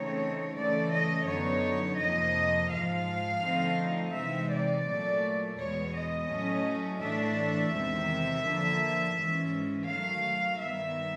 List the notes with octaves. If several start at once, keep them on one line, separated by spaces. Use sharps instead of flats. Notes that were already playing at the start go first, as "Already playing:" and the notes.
Already playing: C#3 E3 A3 C4 D#4 C#5
C#3 E3 A3 D5
D#5
F#2 D3 F#3 B3 D#4 C#5
F2 C3 F3 A#3 D#5
G#2 F3 G#3 F5
D3 F3 A3 C4 D#4
C3 E3 G#3 C4 D#4 E5
D5
A#2 F#3 A3
E2 B2 G#3 B3 C#5
D#5
A2 F#3 A3 C#4
A2 E3 A3 D4 E5
E2 C3 D#3 G#3
D3 F3 A#3
G#2 E3 G#3 C#4
D#3 F#3 A3 F5
G2 D#3 G3 B3 E5